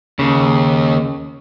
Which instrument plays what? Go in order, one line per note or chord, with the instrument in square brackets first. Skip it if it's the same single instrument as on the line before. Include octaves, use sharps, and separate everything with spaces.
[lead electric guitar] D#2 [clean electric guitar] C#3